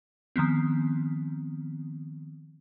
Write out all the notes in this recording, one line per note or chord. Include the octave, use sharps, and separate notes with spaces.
D#3 F3 B3 C4